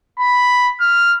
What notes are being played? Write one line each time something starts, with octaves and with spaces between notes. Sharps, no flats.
B5
F6